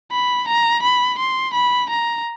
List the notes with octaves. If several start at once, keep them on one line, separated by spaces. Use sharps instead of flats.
B5
A#5
B5
C6
B5
A#5